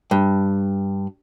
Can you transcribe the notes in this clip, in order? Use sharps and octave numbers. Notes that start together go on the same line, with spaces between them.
G2